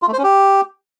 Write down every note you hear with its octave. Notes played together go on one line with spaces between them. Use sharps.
F4
A3
C5
C#4
G4